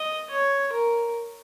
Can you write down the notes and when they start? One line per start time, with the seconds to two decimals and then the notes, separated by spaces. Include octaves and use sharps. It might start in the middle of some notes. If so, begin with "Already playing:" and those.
Already playing: D#5
0.30 C#5
0.72 A#4